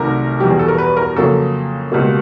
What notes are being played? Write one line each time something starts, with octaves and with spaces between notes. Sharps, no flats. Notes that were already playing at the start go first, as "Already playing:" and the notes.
Already playing: C2 C3 D#3 F#3 A3 A#4
E2 B2 G3 G4
G#4
A4
A#4
B4
A#4
F2 C#3 F#3 A#3 A4
C#2 B2 G3 A#3